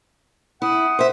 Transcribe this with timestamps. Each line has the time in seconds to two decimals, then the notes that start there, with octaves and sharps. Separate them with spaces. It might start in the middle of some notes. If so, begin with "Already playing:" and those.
0.62 E4 F#5 D#6
0.99 C5 E5